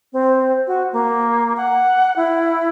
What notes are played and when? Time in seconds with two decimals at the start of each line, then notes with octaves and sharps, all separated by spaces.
0.13 C4
0.67 F#4
0.93 A#3
1.57 F#5
2.16 E4